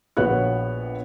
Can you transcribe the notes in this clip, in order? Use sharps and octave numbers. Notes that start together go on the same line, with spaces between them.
A#1 B3 F#4 B4 C#5 F#6